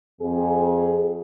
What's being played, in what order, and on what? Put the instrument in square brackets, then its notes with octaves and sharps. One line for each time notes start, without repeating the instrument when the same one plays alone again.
[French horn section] F2 G#4